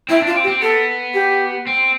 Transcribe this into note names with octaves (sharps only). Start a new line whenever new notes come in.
C4 E4
D4 F4
C4
G4
C4
B3 A4
G4
C4